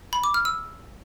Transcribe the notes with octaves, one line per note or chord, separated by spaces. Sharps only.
B5
D6
F6
E6